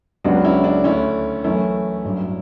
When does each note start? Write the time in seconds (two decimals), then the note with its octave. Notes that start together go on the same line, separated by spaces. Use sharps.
0.24 C#2 C#3 F#3 B3 D4 F#4
0.44 C#4 E4
0.64 D4
0.84 D2 D3 A3 C#4 E4
1.44 F#2 E3 A3 C#4 E4
2.05 A1 G2 F#3